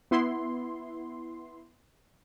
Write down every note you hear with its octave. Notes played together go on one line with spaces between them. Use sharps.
B3 E4 C6